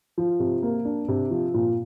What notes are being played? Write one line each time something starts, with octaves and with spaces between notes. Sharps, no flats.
F3
C3
A#3
D4
C3
F3
A#2